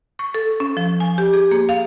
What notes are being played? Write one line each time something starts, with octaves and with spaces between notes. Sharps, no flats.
C#6
A4
C#4
F3
G#5
G4
G#4
A#3
F5